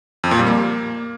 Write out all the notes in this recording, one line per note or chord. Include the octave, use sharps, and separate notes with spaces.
F2
A#2
G3
A#3